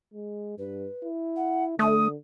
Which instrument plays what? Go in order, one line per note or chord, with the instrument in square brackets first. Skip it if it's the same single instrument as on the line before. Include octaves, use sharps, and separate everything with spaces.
[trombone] G#3
[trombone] G2 [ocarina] B4
[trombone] E4
[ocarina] F#5
[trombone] D3 [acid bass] A3 [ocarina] D#6